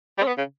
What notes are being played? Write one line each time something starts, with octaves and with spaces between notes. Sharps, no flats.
G3
C#4
B3
C#3